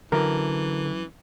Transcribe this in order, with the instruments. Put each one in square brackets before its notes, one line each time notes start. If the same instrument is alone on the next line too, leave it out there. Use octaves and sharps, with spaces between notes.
[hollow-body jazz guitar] F#2 [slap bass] D3 [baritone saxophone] E3 [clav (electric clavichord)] A#4